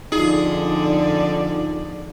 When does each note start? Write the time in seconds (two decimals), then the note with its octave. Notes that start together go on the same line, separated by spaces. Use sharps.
0.12 F2 D3 D#4 F4 G#4 D5